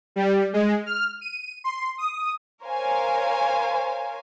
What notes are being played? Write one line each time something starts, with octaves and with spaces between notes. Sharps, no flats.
G3
G#3
F6
D#7
C6
D#6
A#4 C5 C#5 F5 G#5